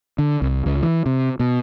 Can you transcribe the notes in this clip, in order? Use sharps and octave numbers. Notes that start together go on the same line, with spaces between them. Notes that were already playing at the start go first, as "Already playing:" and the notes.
D3
C2
C#2
E3
C3
B2